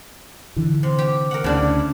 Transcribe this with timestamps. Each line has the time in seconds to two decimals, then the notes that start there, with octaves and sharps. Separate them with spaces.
0.56 D3 E3
0.83 C3
0.99 G4
1.31 A#4 F#5
1.44 D2 C#3 C#4 D4 E4